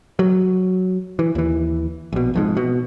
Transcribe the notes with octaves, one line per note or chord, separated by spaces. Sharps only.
F#3
E3
D#2 E3
A#1 B2
F1 F2 G#2
B2